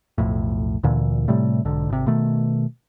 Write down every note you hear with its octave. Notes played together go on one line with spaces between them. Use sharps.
B1 F2 A2
D2 A#2 D3 E3
A2 C3 G3 A3
B1 G#2 D3
G#1 C3
B2 D#3 A3